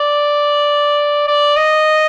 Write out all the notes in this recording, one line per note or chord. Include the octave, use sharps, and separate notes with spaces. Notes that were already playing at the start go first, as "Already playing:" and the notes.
Already playing: D5
D5
D#5